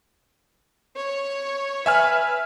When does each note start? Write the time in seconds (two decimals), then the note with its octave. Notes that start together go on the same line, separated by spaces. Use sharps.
0.96 C#5
1.86 B4 E5 G#5 F6